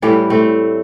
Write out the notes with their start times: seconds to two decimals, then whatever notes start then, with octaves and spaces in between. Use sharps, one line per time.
0.02 A2 E3 G3 E4 G4
0.30 A3 C4